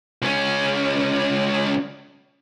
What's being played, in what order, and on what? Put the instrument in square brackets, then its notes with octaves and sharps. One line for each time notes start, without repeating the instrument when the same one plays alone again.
[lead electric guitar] C#2 C#4